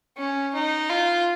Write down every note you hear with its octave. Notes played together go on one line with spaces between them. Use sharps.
C#4
D#4
F4